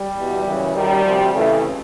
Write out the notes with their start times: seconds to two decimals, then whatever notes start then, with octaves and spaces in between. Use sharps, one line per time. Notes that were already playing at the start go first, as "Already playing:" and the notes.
Already playing: G3
0.16 E2 B2
0.46 F#2 C#3 E3
0.75 F#2 D#3 G3
1.04 D2 C3 F3
1.33 F2 C#3 E3 A3